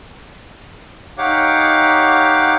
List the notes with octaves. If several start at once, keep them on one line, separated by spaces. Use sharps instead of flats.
D#4 G4 C#5 F5 F#5 D6